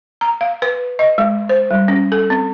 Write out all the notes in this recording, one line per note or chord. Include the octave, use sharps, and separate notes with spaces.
A#5
F5
B4
D#5
G#3
C5
G3
C#4
A4
C4